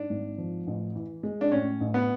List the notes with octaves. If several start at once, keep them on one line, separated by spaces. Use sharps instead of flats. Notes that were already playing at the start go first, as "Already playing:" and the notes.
Already playing: G#2 D4
G#1
F3
A1
E3
G#3
D4
A2 C#4
A1
B3